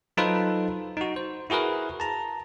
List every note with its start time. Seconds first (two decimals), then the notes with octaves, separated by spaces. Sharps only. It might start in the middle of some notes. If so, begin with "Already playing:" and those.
0.17 F#3 D#4 F4 A4 B4 C5
0.97 D#4 F#4
1.16 C5
1.50 E4 F#4 G#4 A#4 B4
2.00 A5 A#5